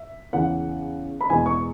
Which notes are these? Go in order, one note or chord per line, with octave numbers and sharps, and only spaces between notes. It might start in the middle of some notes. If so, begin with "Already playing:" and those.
Already playing: E5
E2 C#3 E3 F#5
B5
E2 B2 G#3 G#5
C#6